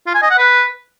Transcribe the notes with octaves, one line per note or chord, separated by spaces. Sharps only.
F4
G#5
D#5
F#5
B4